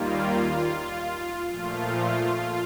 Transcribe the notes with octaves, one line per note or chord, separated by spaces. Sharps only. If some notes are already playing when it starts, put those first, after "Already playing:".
Already playing: D#2 D#3 G3 A#3 F4
A#2 F3 A3 F4